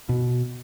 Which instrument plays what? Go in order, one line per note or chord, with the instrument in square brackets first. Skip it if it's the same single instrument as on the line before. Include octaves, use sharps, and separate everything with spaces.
[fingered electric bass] B2